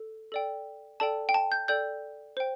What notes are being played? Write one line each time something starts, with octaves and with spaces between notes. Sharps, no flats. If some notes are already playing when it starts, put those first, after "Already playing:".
Already playing: A4
A4 D5 G5
A4 D5 G5 A5
G5
A5
G6
A4 D5 G5 G6
C5 G5